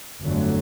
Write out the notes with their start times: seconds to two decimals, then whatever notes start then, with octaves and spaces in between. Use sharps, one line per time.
0.22 G1 F2 D3 F#3 A3